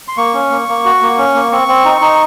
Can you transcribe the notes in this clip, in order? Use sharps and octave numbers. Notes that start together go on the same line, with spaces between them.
C6
A#3 C#6
C#4
A#3
A#3
F#4
A#3
C#4
A#3
C4 C#6
C4
D#4
D#4